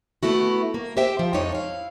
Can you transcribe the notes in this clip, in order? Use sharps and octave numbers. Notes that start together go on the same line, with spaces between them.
A3 B3 E4 F#4
A#3
G4 C5 E5 G5
F3
F2 C3 D4 D#4 C#5
E4 F5